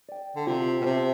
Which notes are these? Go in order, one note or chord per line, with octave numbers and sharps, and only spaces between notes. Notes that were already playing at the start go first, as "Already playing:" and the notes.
D5 G5
D3
C3 F4
B2
C3 C5 E5 A5